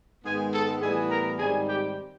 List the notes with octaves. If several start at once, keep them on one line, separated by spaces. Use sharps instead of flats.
G#2 D#3 G#3 B3 G#4 G#5
A4 A5
A2 E3 G3 B3 G#4 G#5
A#4 A#5
G#2 D#3 G3 C4 G#4 G#5
G4 G5